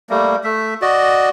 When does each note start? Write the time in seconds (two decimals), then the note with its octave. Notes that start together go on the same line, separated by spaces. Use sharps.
0.10 G3 A3 A#3
0.44 A3 E5
0.82 F#4 D5 D#5